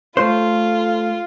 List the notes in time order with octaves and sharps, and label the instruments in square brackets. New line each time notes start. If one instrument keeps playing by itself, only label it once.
[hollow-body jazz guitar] A3 C5 [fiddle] F4